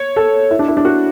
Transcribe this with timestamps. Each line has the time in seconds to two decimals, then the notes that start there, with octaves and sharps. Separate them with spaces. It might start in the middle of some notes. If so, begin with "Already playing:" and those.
Already playing: C#5
0.16 A4
0.51 E4
0.59 D4
0.68 E4
0.77 D4
0.85 F#4